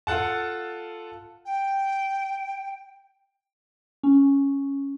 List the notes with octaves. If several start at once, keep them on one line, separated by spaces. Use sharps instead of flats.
F4 A4 F#5 A5
G5
C#4